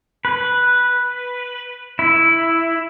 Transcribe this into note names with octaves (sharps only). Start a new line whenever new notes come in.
B4
E4